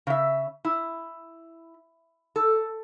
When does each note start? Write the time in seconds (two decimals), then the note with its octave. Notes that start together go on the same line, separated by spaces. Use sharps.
0.07 C#3 E5
0.65 E4
2.36 A4